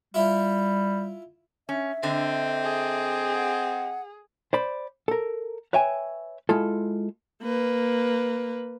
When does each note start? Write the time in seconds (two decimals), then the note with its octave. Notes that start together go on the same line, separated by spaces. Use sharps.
0.14 G3 E4 F4 E5
1.69 C#4 E5
2.03 D3 C4 D#5 G5
2.63 G#4
3.35 F#5
4.53 C5 D5 B5
5.08 A4 A#4
5.73 B4 C#5 E5 G5 G#5
6.49 G#3 E4 F4 A4
7.43 A#3 B4